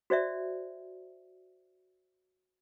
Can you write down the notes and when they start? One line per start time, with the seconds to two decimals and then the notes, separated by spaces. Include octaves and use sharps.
0.10 F#4 C5 D5 E5